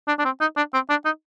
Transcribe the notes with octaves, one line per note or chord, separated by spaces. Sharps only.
D4
D4
C4
D#4
D4
C4
D4
D#4